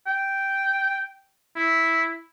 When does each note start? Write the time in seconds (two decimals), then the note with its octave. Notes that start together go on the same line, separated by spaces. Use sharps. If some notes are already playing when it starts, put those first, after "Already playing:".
0.06 G5
1.56 E4